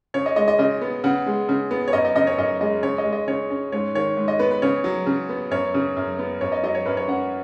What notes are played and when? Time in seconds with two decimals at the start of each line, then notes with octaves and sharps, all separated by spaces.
0.14 C#3 C#5
0.26 D#5
0.36 G#3 D#5
0.48 D#5
0.59 C#3 D#5
0.81 B3
1.04 C#3 F#5
1.26 G#3
1.49 C#3
1.71 B3
1.88 C#5
1.93 F#2 D#5
2.05 D#5
2.15 C#3 D#5
2.27 C#5
2.38 F#2 D#5
2.61 G#3 D#5
2.83 C#3 C#5
2.98 D#5
3.05 G#3
3.12 D#5
3.27 C#3 C#5
3.50 C#4
3.72 G#2 C#5
3.95 D#3 C#5
4.17 G#2
4.28 D#5
4.39 B3 B4
4.51 B4
4.62 C#3 C#5
4.84 F#3
5.06 C#3
5.29 B3
5.51 F#2 C#5
5.74 C#3
5.97 F#2
6.19 B3
6.41 F#2 C#5
6.52 D#5
6.63 F#3 D#5
6.75 C#5
6.86 F#2 B4
6.97 C#5
7.08 C#4 F#5